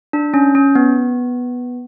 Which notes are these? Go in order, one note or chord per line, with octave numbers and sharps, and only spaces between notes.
D4
C#4
C#4
B3